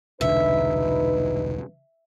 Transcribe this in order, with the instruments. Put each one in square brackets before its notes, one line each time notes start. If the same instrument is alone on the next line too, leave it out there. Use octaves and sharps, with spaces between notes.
[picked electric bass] E1 C2 D3 [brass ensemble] D#4 B4 [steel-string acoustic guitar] E5